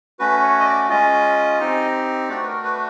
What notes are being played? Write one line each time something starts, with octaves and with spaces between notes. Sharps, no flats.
A3 C#4 F#4 B4
C#5
D#5
D5
G#3 C#4 F4 D#5
C4 D#4 G4
A3 D4 F#4 D5
B4
A#4
B4